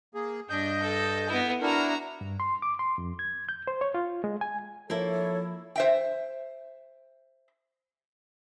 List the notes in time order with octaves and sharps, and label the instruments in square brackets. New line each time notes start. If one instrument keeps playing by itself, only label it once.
[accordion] A#3 G#4
[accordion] G2 D#5 G6 [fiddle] D4
[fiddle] A4
B3 E4
[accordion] D4 E4 A#4 [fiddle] F#4 A#5
[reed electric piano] G2
C6
D6
C6
F2
G#6
G6
C5
C#5
F4
G#3
G#5
[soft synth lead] F3 [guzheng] A#3 E4 [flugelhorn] A4 [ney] C#5
[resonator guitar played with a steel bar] C5 E5 G5